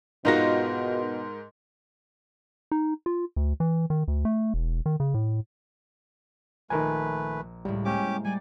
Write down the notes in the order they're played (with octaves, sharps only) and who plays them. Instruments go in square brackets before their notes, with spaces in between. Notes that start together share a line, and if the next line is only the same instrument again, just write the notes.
[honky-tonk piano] G#2 A#4 A#6 [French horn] B2 [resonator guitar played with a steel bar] D#4 F4 F#4
[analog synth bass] D#4
F4
D2
E3
D#3
D2
A3
E1
D#3
C#3
A2
[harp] A#1 [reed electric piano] D#3 A#4 G#5 [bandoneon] A3 B4
[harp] C#2 A2 [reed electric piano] G3
[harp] G#3 A#3 C5 [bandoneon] C#4 G4 D6
[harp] G3 D5 [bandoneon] G#5